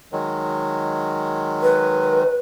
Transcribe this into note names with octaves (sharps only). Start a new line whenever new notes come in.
D#3 F#3 G#3
B4